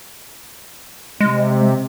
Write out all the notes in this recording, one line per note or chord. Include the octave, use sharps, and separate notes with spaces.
C3 G#3